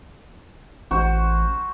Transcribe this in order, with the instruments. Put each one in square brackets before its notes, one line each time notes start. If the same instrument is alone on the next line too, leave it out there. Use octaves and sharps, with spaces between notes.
[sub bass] A1 [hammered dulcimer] F#4 C5